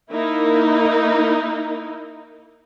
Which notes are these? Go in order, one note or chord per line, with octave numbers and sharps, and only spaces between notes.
A#3 D#4 E4 A#4